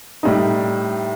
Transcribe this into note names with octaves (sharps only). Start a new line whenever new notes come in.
A2 G3 D#4